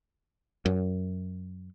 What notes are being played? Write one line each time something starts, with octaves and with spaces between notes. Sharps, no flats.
F#2